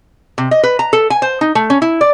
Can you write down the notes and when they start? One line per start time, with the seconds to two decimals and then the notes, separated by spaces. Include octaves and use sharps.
0.38 C3
0.51 D#5
0.64 B4
0.79 A#5
0.93 A4
1.10 G#5
1.22 C5
1.41 D#4
1.55 A3
1.70 C#4
1.82 E4
2.01 D5